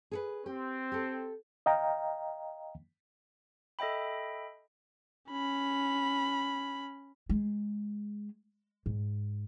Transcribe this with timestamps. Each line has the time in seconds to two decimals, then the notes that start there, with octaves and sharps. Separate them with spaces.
0.11 G#4 A4 B4
0.46 C4 G4
0.92 G4 A4
1.66 D#5 F5 G5 A#5
3.79 A4 D#5 E5 G5 B5
5.30 C#4 B5
7.29 G#3
8.86 G#2